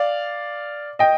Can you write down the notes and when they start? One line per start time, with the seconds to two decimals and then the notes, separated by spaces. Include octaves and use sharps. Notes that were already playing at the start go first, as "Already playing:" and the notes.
Already playing: D5 F5
0.99 D#5 G5